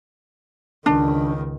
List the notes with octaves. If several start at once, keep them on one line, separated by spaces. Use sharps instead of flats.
C#2 D#3 D4